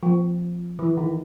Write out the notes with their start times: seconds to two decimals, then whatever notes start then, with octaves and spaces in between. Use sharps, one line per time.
0.03 F3
0.79 E3
0.97 D#3